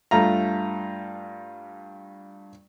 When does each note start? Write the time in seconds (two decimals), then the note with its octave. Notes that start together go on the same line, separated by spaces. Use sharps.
0.11 G2 A3 F4 A#5